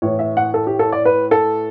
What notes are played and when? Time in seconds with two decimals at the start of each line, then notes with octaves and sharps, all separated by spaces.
0.02 A2 E3 C#5
0.19 E5
0.37 F#5
0.54 A4
0.67 G4
0.79 A4
0.92 D5
1.05 B4
1.31 A4